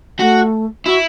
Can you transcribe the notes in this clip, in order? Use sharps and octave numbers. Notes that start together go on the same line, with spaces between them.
A3 F#4
E4 F#4